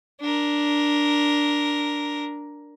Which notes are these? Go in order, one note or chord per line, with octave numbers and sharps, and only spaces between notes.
D4 A#4